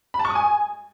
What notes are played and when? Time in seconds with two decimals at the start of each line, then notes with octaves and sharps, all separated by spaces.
0.14 B5
0.19 A5
0.25 C#6
0.30 D#6
0.35 G#5